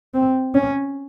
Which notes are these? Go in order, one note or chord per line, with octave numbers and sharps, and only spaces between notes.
C4
C#4